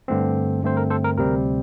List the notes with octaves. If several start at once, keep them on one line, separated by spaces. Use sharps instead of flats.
G2 D3 A3 C4
G2 D3 A3 C4 C5
A#4
A4 C5
A#4
D2 C3 G3 C4 A#4